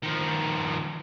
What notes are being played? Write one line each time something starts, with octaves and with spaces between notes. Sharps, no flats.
D#3 F3